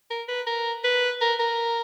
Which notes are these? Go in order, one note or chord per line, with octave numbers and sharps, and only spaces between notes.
A#4
B4
A#4
B4
A#4
A#4